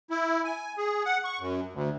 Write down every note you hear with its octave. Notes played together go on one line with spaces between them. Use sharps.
E4
G#5
G#4
F#5
C#6
F#2
D2